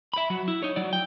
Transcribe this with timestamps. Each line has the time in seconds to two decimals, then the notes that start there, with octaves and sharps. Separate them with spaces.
0.14 E5 B5
0.30 F#3 F#4
0.48 E4
0.63 D#4 C#5
0.76 F#3 D5
0.93 G5